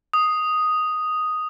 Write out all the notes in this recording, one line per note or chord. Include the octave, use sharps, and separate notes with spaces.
D#6